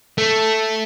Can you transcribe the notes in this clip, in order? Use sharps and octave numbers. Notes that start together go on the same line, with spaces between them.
A3